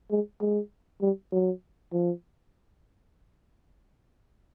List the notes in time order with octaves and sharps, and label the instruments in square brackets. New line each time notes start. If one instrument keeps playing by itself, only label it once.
[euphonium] G#3
G#3
G3
F#3
F3